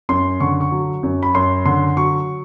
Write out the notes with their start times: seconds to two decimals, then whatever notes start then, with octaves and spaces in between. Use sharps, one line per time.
0.09 F#2 C6
0.40 D3 C#6
0.61 C#6
0.72 F#3
1.03 F#2
1.23 B5
1.35 F#2 C6
1.66 D3 C6
1.97 F#3 C#6